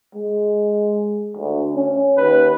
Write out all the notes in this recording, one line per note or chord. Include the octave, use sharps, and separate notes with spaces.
G#3
D2
C#4
D#2 B4